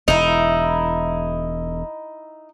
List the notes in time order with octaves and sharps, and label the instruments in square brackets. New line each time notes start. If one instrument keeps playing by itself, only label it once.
[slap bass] E1 [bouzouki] D#4 E4